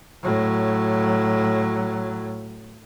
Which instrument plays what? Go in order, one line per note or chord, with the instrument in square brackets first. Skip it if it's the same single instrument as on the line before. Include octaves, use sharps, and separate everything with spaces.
[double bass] A2 F#3